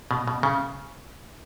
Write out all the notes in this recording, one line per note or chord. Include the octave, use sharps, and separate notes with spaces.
B2
B2
C#3